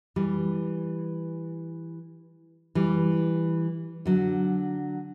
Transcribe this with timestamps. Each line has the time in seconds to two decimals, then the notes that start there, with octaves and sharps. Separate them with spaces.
0.16 E3 G3
2.75 E3 G3
4.06 D3 F#3